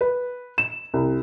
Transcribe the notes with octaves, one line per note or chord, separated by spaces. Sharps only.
B4
E7
C2